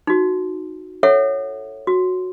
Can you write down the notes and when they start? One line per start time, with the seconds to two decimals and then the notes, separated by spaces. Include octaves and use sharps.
0.07 D#4 F#4
1.03 A4 C#5 E5 F#5
1.87 F#4